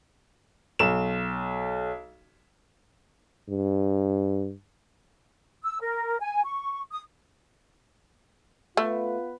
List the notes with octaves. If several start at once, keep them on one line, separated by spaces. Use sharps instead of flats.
B1 E7
G2
E6
A#4
G#5
C#6
D#6
A3 B3 F4 B4